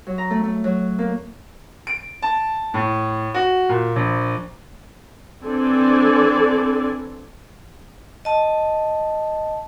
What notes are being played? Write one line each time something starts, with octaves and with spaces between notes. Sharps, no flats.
F#3
A#5
A3
A3
F#3
A#3
D7
A5
A2
F#4
A#2
A#1
E3 C4 D4 A4 D5 G#5
D#5 A5